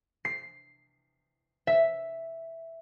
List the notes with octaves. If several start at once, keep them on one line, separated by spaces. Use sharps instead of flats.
C7
E5